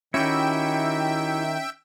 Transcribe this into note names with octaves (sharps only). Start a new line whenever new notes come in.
D#3 C#4 E4 F#4 G4 E5 G5